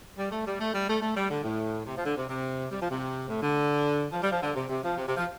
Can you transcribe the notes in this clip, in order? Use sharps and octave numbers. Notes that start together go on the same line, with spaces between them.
G3
A3
G3
A3
G3
A3
A3
G3
D3
A2
C3
F3
D3
C3
C3
G3
F3
C3
A2
D3
F3
G3
F3
D3
C3
C3
F3
C3
C3
F3